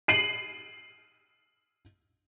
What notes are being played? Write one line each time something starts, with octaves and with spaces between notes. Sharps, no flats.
C7 D#7 F#7